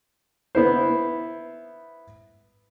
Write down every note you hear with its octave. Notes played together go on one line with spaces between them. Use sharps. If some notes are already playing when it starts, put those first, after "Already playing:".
B3 E4 C5